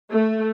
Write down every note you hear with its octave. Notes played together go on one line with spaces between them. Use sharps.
A3